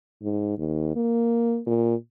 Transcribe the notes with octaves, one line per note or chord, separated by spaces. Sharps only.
G#2
D#2
A#3
A#2